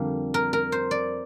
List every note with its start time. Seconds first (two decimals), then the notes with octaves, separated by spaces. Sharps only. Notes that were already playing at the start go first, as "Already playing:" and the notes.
Already playing: F2 D3 G3 A#3 A#4
0.34 A#4
0.53 A#4
0.72 C5
0.91 D5